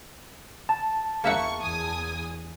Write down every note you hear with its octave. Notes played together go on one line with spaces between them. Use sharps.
A5
E2 A#3 E5 F#5 C#6
E2 G#5 D#6